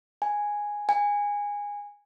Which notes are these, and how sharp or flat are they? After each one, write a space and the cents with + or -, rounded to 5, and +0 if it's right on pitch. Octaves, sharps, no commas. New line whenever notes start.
G#5 -5
G#5 -15